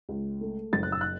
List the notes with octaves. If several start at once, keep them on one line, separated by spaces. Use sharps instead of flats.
C#2
A3
F#1 A6
F#6
E6
F#6